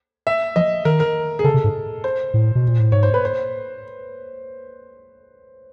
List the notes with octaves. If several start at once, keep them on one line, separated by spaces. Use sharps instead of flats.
E5
F3 D#5
D#3 A#4
A#4
G#4
C#3 A4
C3
G#2
C5
A2
B2
A#2
A2
G#2 C#5
C5
B4
C5